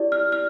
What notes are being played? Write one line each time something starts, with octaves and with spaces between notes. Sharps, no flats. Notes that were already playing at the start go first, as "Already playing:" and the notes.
Already playing: E4 G4 D5
F6
F6